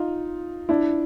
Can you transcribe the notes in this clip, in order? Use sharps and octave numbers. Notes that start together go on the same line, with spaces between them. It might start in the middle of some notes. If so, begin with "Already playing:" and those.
Already playing: D#4 F4
D4 E4